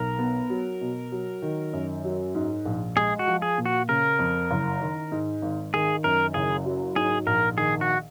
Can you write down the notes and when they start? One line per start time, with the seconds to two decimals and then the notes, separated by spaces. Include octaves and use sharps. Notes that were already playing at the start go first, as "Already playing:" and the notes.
Already playing: B1 A#4
0.19 B3
0.50 F#3
0.81 B2
1.12 F#3
1.42 D#3
1.73 F#2
2.04 F#3
2.35 G#2
2.65 A#1
2.96 G#3 G#4
3.19 F#4
3.27 F3
3.42 G#4
3.58 A#2
3.66 F#4
3.89 C#3 A#4
4.19 F2
4.51 F#1
4.81 D#3
5.12 G#2
5.42 G#1
5.74 D#3 G#4
6.04 F#2 A#4
6.34 F#1 G#4
6.66 F#3
6.96 G#2 G#4
7.27 A#1 A#4
7.58 D#3 G#4
7.81 F#4